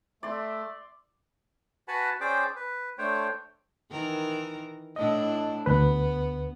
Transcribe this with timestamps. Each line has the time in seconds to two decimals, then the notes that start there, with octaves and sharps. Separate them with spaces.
0.23 A3 D5 E5 C6
1.88 F#4 B4 F#5 G#5 A5 B5
2.21 C#4 G#4 C5 D5 G5 D6
2.56 B4
2.98 A3 D4 C5 C#5 G5
3.91 D#3 E3 A#4
4.96 A2 D4 E4 D#5
5.66 D2 B3 B4